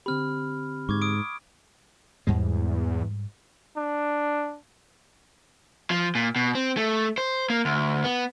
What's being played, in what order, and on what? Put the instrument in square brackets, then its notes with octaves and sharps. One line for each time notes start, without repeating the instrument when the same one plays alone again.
[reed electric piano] D3 C4 G4 [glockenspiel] B5 F6
[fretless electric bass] G#2 [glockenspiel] C#6 D6 G#6
[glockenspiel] D#6 D7
[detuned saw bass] E2 [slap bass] G#2 G3 G#3
[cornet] D4
[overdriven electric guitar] F3
A#2
B2
C4
A3
C5
A#3
D2
B3